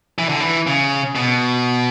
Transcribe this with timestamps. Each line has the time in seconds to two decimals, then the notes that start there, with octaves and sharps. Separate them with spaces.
0.19 E3
0.29 D3
0.40 E3
0.67 C#3
1.16 B2